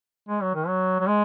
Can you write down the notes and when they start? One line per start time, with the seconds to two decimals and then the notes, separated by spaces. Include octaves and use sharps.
0.29 G#3
0.42 F#3
0.55 D#3
0.67 F#3
1.00 F#3
1.07 G#3